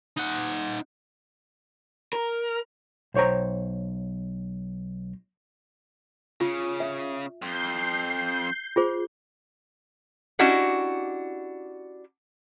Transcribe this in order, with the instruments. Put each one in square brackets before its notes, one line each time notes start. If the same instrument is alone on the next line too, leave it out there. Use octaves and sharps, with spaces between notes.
[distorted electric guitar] D#4 F#5
[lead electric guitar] A#4
[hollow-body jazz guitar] B1 C5 C#5 G5 A#5
[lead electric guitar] C#3 [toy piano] F4
[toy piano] E5
[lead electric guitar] F2 [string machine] G6 C7
[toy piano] F4 G#4 C5
[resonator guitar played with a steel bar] C#4 D4 E4 F#4 G4 D#5